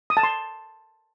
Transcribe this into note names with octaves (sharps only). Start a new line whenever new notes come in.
D#6
A5
C6